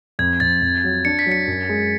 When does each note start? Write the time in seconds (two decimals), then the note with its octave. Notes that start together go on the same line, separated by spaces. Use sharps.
0.19 F2 G#6
0.40 F2 A6
0.62 F2
0.84 F#3
1.05 D4 C#7
1.19 B6
1.26 F#3
1.32 C#7
1.47 F#2
1.69 G#3